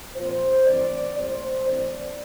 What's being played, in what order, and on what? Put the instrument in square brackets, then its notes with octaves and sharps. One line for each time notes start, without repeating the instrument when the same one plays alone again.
[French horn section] A#2 F3 C4 C5
G2 E3 A3 C4 D5
A2 G3 C4 C5
G2 E3 A3 C4 D5